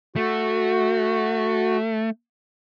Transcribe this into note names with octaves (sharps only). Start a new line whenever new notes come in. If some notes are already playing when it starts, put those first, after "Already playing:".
A3 F#4